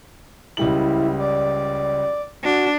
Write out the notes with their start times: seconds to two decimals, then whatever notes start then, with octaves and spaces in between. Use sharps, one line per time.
0.57 C#2 G3 E4 F#7
1.19 D5
2.44 D4 F#4